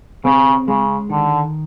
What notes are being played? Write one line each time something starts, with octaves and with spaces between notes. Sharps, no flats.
C#3 C4
C#3 G#3
D3 D#3